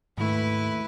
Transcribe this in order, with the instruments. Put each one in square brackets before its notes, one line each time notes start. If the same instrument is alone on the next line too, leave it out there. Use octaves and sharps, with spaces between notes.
[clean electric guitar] D#2 A3 [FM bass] G#2 [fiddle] E4 B4